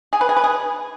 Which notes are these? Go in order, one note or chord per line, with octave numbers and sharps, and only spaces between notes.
G#4
B4
G#4
B4
G#4